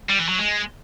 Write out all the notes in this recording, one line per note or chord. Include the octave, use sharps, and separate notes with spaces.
G3
E3
F#3
G#3